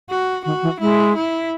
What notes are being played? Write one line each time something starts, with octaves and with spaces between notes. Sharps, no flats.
F#4
D#3 F#4
E3
G#3 E4
E4